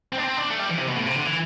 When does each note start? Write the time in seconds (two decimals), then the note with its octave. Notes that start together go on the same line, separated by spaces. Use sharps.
0.13 C4
0.18 D4
0.23 C4
0.37 D4
0.50 A3
0.59 G3
0.70 E3
0.78 C3
0.88 B2
0.97 A2
1.06 C3
1.15 D3
1.25 E3